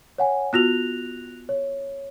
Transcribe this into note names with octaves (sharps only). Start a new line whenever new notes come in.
C#5 F#5 G#5
B3 F4 F#4 F#6 A#6 F7
C#5